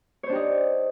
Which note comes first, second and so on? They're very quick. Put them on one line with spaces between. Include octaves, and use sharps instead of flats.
C#5 C5 D4 G4 D#4